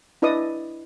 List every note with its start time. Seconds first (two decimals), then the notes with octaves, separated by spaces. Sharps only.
0.22 D4 E4 B4 D5 D#5 D#6